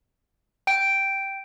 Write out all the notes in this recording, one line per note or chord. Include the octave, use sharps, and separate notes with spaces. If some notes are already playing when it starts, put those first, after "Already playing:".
G5 D7